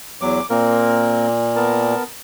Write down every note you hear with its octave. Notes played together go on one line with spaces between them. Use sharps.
E2 F#3 D6
A#2 A#3 C4 A#4
B3 A#4 A5